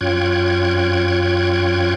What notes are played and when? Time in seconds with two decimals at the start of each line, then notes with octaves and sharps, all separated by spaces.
0.01 F#2 F4 C#5 G5 F#6 G#6